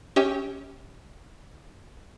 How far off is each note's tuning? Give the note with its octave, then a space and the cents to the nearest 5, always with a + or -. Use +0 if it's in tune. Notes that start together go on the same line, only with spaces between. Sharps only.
C#4 +0 G4 +0 E5 -45